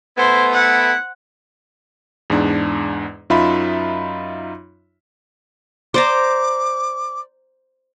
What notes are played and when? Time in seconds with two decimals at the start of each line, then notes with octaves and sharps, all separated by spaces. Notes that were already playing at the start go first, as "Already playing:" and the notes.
0.17 A3 B3 E4 C5
0.53 E4 F#5
2.30 E2 G#2 D4
3.30 F#2 D#4 F4 E5 B5
5.94 C5 D5 A#5 D6